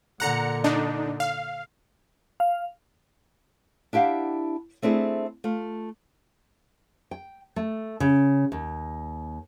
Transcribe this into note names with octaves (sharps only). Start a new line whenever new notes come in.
A#2 D3 F#5 A#5 C#7
D4 D#4
F5
F5
D4 E4 G4 F5 F#5
A3 C4 D4 E4 G#4
A3 F4
G5
A3
C#3
D#2